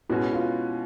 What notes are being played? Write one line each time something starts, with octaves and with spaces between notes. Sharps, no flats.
B2 G#3 C#4 E4 F#4
F4